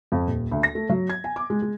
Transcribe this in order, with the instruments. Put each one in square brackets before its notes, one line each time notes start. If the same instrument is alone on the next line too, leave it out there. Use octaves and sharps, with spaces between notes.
[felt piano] F2
D#1
D2
A#6
A3
F#3
G#6
G#5
D6
G#3
G#3